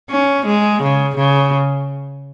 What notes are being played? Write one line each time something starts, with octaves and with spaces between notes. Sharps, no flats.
C#4
G#3
C#3
C#3